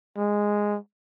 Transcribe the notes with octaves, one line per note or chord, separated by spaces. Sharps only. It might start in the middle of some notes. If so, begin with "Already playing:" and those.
G#3